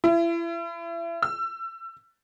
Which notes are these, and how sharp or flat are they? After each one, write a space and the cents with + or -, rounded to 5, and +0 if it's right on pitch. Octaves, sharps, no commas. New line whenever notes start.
E4 +35
E6 +30